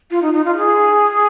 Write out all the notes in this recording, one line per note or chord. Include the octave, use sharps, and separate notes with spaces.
F4
D#4
D#4
F4
G#4